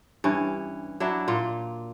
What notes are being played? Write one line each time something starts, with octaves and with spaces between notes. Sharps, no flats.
G2 E3 C#4
F#3 D4 E4
A#2 F4